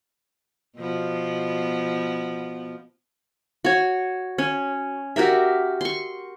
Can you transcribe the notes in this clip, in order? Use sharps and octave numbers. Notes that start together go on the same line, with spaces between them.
B2 F3 B3
F#4 C#5
C#4
F#4 G4 A#4 E5
C6 C#6